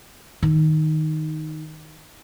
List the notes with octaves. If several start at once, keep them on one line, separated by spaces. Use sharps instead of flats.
D#3 D#4